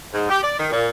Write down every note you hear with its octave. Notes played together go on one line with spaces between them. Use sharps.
G#2
G4
D5
D#3
A#2